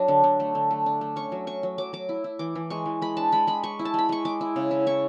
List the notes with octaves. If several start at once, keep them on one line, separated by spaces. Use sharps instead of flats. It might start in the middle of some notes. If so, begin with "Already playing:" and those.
Already playing: F#3 D4
D3
D3
A3
D3
A3
D4
A3
C#4 C#6
F#3
F#3 C#6
F#3
F#3 D6
F#3 D6
E4
E4
E3 D6
E3
G#3 C#6
E3
G#3 B5
D4 A5
G#3 B5
G#3 B5
G#3 C#6
E4
A5
G#3 B5
G#3 C#6
G#3 D6
E4
C#3
E4
E4 C#6